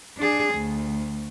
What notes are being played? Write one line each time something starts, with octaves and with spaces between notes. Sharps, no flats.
D4 G#4
D2